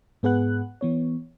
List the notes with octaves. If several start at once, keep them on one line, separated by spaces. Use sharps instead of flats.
G#2 B3 G#4 B4 F#5 F#6
E3 B3 C#5